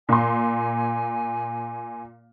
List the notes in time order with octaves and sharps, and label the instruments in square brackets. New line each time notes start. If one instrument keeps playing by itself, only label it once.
[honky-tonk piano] A#2 C6 [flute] G#5